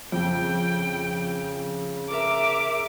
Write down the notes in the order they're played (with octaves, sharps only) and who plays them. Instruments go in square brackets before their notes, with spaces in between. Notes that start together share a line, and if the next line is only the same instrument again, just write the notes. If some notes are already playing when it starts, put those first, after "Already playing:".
[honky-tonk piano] F2 [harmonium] C#3 [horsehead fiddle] G5
[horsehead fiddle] A#4 E5 [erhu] D6